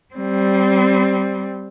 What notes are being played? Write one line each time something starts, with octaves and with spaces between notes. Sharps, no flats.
G3 C4